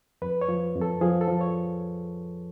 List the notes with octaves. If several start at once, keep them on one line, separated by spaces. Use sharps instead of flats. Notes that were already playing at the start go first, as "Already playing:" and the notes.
F2 B4
C#5
F3
F2
A4
F3 G#4
A4
F3
C#5